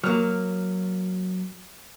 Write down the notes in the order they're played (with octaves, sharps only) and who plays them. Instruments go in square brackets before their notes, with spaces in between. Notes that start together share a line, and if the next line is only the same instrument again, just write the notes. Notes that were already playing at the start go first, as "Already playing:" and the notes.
[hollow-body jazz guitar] F#3 A#3 [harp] F6